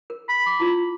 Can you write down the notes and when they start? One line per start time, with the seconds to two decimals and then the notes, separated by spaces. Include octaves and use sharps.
0.10 A#4
0.29 B5
0.46 D6
0.59 E4 F4